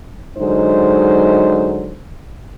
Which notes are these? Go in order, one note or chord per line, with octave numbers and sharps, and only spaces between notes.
D3 F#3 G#3 D#4 C5